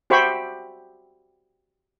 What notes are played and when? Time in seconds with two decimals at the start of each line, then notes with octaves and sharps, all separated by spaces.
0.10 F#4 G4 C5 E5 B5 C#6